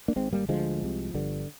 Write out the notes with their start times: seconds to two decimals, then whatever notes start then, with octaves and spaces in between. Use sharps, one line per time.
0.08 A#3 D4
0.16 G#1 G#2 G#3 C4
0.33 G3 A#3
0.49 D2 D3 F3 G#3
0.82 C2 C3
1.14 G1 G2 D3